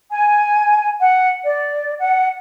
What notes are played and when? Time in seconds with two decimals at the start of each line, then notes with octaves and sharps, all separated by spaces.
0.10 G#5
1.00 F#5
1.44 D5
1.99 F#5